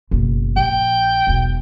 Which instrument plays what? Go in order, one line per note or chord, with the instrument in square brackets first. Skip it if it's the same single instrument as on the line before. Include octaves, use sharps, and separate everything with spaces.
[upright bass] F#1 B2
[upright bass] A#1 [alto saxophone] G5
[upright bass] E1 B1